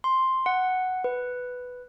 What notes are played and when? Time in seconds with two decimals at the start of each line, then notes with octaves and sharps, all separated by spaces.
0.04 C6
0.46 F#5
1.04 B4